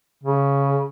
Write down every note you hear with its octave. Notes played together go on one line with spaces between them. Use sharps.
C#3